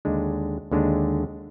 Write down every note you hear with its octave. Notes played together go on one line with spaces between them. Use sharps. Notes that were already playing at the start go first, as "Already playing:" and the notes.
D#2 D3 G#3 D4
D#2 D3 G#3 D4